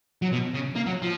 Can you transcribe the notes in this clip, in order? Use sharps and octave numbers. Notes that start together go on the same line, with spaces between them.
F#3
B2
C#3
A#3
F#3
F3